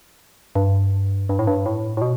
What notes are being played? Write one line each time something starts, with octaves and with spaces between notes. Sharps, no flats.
G2
G2
A2
G2
A2
A2
B2